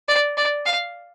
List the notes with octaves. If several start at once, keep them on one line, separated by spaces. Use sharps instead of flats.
D5
D5
F5